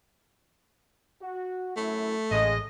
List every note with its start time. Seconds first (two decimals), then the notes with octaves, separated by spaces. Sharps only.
1.22 F#4
1.77 F#2 A2 A3 E4
2.31 A1 C#3 G#3 D#5